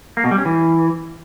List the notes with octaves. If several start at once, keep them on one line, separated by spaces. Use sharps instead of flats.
A#3
B2
G3
C#4
E3